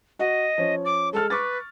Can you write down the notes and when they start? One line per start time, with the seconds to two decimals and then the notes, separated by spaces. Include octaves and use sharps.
0.19 F#4 D#5 F#5
0.58 F3 C#4
0.85 D6
1.13 G#3 A4 F6
1.30 B4 C#6 D6 A6